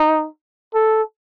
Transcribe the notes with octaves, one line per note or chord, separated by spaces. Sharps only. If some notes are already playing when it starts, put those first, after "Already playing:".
Already playing: D#4
A4